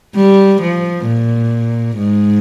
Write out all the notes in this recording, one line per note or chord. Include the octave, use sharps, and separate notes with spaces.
G3
F3
A#2
G#2